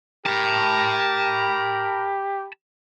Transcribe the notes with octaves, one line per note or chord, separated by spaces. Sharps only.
G4 A#4 A5 B5